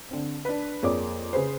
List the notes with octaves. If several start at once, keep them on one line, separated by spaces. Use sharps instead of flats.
D3 C4
D4 B4
F2 A#3 G#4 C#5 D5 D6
C#3 G#4 B4 C5